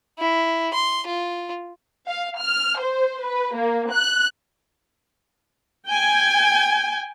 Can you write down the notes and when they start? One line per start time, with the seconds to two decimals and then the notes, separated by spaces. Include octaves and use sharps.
0.19 E4
0.74 C6
1.07 F4
2.08 F5
2.40 F6
2.79 C5
3.25 B4
3.55 A#3
3.92 F#6
5.86 G5 G#5